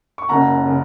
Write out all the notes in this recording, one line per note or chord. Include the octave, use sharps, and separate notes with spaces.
C#6
F#1 F#2 C#3 F#5 A#5
C#3